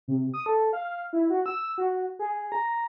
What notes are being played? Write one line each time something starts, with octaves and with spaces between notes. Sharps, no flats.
C3
D#6
A4
F5
E4
F#4
E6
F#4
G#4
A#5